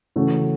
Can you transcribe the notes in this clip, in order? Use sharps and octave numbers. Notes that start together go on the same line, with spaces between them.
C#3 E3 A3 C#4 F#4